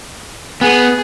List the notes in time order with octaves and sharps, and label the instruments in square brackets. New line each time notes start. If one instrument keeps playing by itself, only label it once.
[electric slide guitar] B3 [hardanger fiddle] G#4